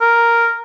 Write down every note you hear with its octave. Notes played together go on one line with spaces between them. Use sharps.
A#4